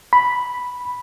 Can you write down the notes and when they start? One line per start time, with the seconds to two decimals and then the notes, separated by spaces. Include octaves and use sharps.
0.13 B5